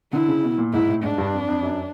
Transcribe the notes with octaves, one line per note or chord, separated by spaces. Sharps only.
D3 E4
C#3
B2
A#2
G#2 E4
A2
G#2 D4
G2
F2
F2
F#2